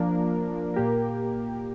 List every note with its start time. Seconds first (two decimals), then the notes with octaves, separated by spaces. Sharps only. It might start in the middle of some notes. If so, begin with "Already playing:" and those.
Already playing: F3 A#3 D4 A#4
0.74 A#2 A#3 G4 A#4